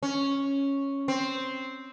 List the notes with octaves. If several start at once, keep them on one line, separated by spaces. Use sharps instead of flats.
C#4
C4